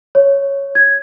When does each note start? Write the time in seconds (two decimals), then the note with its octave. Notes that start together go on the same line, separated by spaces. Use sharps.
0.15 C#5
0.75 G#6